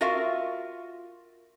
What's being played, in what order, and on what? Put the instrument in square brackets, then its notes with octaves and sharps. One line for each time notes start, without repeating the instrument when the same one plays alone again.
[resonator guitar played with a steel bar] F4 F#4 A#4 E5 F5